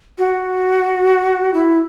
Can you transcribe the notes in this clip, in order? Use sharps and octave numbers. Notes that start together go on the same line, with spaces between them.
F#4
E4